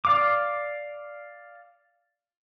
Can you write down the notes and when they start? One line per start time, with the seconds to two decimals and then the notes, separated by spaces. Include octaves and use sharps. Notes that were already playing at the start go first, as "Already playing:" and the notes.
0.05 D5 F5 D6